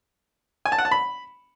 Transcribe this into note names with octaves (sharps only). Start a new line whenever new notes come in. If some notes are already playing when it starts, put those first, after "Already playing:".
G#5
A5
F#5
A5
B5